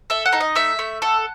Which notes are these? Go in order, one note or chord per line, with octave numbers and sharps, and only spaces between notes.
A4 E5
F#5
D#4
D#5
A3 E5
A3
A4 F#5